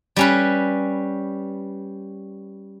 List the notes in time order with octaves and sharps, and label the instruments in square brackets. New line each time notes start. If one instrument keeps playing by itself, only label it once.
[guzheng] G3 C#4 B4